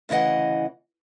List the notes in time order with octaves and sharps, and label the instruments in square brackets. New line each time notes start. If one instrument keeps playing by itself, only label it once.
[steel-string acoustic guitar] D2 C#3 E3 D#5 F#5